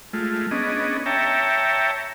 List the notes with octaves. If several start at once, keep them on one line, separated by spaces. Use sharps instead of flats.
G#3 A3 F4
B3 C#4 D4 G#4 D#5
C#5 E5 G5 A5 A#5